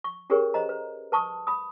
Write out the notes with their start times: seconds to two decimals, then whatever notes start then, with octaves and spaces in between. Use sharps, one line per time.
0.04 C#6
0.30 C#4 G4 G#4 A#4 B4 C#5
0.54 C5 D#5 A#5
0.69 B4
1.12 B4 A5 C#6 D#6
1.47 B5 D#6